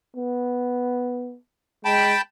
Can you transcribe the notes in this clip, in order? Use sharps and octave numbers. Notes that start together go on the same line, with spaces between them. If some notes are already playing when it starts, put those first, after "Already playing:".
B3
G#3 G5 A5 B5